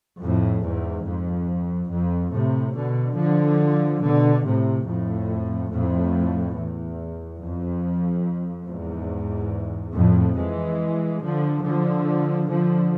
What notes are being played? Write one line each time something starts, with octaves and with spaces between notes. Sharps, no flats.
F2 A2
E2 G#2
F2
F2
A2 C3
B2 D3
D3 F3
B2 D3
A2 C3
F2 A2
F2 A2
E2
F2
E2 G#2
F2 A2
E3 G#3
D3 F3
D3 F3
D3 F3